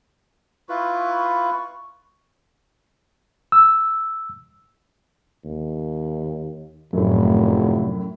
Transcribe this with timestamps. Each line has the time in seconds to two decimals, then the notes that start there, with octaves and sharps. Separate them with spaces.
0.69 E4 F4 B4 C#6
3.52 E6
5.45 D#2
6.93 F1 F#2 A2